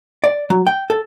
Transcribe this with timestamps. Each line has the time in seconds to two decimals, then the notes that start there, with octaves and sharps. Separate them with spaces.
0.24 D5
0.50 F#3
0.67 G5
0.90 A4